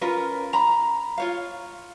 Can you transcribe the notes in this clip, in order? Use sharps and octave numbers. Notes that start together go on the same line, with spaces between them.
C#4 F4 A#4 B4
A#5 B5
F4 C#5 F5